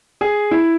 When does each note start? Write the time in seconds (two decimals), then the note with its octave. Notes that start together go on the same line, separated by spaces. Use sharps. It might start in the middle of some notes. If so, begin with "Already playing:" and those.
0.21 G#4
0.51 E4